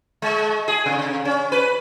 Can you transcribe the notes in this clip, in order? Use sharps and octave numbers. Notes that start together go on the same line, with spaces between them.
G#3
G#4
C3
C#4
B4